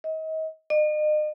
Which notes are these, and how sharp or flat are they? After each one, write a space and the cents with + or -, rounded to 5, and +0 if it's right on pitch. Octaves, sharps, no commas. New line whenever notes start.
D#5 +35
D#5 -40